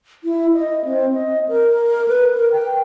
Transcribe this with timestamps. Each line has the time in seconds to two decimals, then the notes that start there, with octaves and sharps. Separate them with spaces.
0.24 E4
0.54 D#5
0.85 C4
1.13 D#5
1.48 A#4
2.08 B4
2.35 A#4
2.53 G5